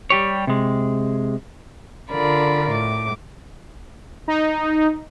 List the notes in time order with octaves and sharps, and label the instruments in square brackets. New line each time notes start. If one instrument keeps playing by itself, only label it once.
[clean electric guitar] G3 G4 C#5
C3 G#3
[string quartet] D3 F4 A#4 D5 B5
A2 D6
[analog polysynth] D#4